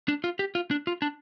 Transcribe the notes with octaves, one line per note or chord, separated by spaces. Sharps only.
D4
F4
G4
F4
D4
F4
D4